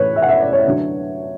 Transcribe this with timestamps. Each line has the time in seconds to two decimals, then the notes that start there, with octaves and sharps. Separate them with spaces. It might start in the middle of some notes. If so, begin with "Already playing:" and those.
Already playing: A2 E3 B4 C#5
0.16 E5
0.22 F#5
0.29 E5
0.41 D5
0.53 C#5
0.67 D3 F#3